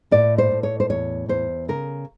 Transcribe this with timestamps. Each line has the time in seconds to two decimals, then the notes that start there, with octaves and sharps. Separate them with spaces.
0.11 A2 D5
0.38 C5
0.51 A2
0.63 C#5
0.80 C5
0.89 E2 C#5
1.28 E2 C5
1.68 C#3 A#4